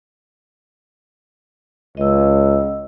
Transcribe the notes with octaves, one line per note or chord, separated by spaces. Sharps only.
C#2 D#5 E6